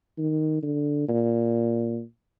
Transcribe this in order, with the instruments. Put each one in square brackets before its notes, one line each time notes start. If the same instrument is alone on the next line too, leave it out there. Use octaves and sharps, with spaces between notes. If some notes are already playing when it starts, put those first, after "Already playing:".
[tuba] D#3
D3
A#2